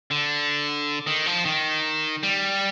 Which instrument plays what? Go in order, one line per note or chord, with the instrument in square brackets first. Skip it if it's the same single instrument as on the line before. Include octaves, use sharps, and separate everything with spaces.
[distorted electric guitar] D3
D#3
F3
D#3
G3